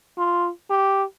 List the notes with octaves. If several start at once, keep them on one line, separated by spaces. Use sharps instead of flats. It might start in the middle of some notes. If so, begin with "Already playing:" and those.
F4
G4